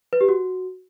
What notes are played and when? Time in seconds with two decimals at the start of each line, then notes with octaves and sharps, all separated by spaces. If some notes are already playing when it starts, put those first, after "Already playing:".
0.13 B4
0.21 G4
0.29 F#4